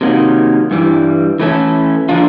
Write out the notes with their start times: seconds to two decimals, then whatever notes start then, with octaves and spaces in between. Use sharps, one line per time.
0.01 C3 D#3 F#3 A#3
0.71 G2 E3 G3
1.40 E3 A3 C#4 E4 A4
2.09 D3 F3 A#3 D4 F4